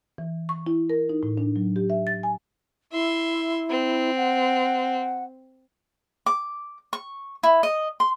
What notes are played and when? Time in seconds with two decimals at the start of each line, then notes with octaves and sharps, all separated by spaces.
0.18 E3
0.49 C#6
0.66 E4
0.90 A#4
1.09 D#4
1.23 A2
1.37 D4
1.56 F#3
1.76 G4
1.90 E5
2.07 A6
2.23 G#5
2.92 E4 E5 C6
3.70 C4
4.16 F#5
6.26 D6
6.93 C#6
7.43 E4
7.63 D#5
8.00 C6